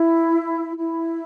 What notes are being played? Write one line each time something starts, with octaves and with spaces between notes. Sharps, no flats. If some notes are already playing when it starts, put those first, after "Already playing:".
Already playing: E4
E4